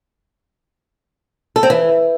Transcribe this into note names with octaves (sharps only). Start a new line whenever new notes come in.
A4
C4
E3